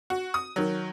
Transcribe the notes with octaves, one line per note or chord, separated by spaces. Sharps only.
F#4
D#6
D#3 F#3